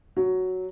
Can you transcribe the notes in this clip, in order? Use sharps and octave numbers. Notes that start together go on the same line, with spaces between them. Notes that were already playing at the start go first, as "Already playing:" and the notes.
F#3